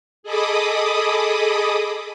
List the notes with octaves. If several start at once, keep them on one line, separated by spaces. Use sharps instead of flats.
G#4 A4 D#5 B5 D6 D#6